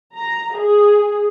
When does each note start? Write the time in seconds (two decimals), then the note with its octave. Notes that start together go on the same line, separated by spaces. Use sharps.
0.17 A#5
0.58 G#4